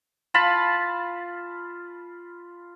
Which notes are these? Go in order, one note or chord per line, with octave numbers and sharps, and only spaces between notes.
F4 A5 B5